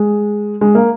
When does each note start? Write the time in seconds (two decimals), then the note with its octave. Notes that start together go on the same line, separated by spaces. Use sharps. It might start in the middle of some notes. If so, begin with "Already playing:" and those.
Already playing: G#3
0.61 G#3
0.75 A#3